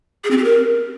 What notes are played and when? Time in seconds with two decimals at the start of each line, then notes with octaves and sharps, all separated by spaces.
0.24 G#4
0.31 C4
0.37 G4
0.44 A#4